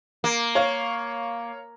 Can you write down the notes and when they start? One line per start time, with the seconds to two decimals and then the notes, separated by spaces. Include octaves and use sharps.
0.24 A#3
0.55 C#5 F5 C#6